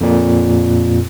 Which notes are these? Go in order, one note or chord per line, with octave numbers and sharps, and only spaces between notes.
F2 A#2